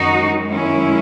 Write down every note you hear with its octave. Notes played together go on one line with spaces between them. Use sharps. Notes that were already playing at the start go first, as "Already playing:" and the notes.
Already playing: F#2 D#3 G#3 D#4 F#4
C#4 E4